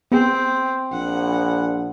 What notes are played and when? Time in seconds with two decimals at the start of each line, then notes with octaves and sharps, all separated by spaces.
0.12 B3 C4 G#4
0.92 A#1 F#5